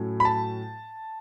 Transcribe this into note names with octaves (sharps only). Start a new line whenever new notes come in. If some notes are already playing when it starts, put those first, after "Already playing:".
Already playing: A2 F#3 A3 C#4
B5
A5